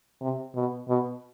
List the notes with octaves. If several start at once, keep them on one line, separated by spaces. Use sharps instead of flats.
C3
B2
B2